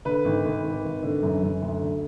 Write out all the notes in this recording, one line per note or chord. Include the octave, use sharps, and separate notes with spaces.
D3 B4
G#1
G#1
G#1
G#1
D3
F#2
F#2
D2
D3